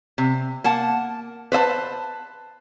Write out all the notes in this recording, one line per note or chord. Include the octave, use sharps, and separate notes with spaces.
C3
A#3 F#5 A5
B4 C5 E5 A5